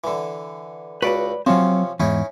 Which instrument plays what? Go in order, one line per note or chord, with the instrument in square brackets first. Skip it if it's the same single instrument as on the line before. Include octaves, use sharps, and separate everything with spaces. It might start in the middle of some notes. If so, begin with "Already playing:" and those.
[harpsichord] D3 E3
[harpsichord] C#2 F#4 [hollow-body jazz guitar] B4 D5 B5
[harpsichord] C3 F3 C#4 [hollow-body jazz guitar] F#3 C4
[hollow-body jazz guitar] E2 G#2 [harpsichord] C#4 D#4 E4